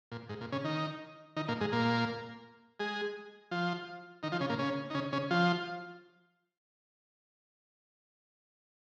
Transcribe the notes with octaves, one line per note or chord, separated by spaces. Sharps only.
A#2
G#2
A#2
C#3 C#4
D#3 D#4
D#3 D#4
A#2 A#3
G#2 G#3
A#2 A#3
G#3 G#4
F3 F4
D#3 D#4
F3 F4
C#3 C#4
A#2 A#3
C#3 C#4
D#4
C#3 C#4
C#3 C#4
F3 F4